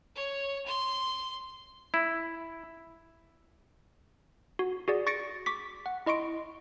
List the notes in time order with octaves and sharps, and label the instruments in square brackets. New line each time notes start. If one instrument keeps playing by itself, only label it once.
[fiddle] C#5
C6
[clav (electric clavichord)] E4
[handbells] F#4
F#4 G#4 D5
C#6 A6 A#6 C#7 D7
C#6 D6 B6
F#5
E4 D#5 C6 C#6 D7